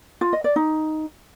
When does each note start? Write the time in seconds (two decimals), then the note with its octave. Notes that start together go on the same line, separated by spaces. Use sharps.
0.21 F4
0.33 D#5
0.44 D5
0.56 D#4